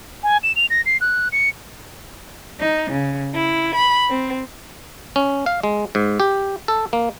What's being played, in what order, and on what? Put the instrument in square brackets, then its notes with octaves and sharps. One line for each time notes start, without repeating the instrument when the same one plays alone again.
[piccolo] G#5
E7
F7
A#6
C7
F#6
C#7
[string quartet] D#4
C#3
E4
B5
C4
[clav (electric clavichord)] C#4
F5
G#3
G#2
G4
A4
A#3